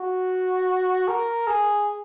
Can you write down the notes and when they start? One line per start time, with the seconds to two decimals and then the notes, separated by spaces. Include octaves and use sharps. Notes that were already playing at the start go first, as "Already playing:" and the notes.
Already playing: F#4
1.08 A#4
1.47 G#4